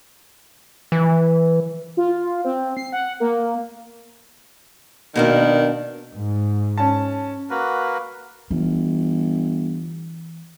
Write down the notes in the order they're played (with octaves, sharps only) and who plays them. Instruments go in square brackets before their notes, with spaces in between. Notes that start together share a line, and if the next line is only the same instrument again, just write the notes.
[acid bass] E3
[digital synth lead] F4
C4
C7
F#5
A#3
[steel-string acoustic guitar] B2 A#3 D4 [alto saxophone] D#3
[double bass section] G#2
[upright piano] C#4 A5
[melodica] A#3 F#4 A#4 B4
[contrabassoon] G1 [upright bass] E3